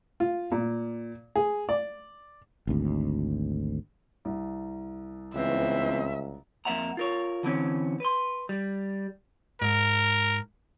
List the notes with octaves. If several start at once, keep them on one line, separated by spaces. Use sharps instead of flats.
F4
A#2
G#4
D5
G#1 D2
C2
C#2 E3 B3 C4 E5
F2 A#3 C#5 E5 F#5 A#5
F4 A#4 C#5
D3 E3 C4 C#4
B4 C6
G3
G#2 A#4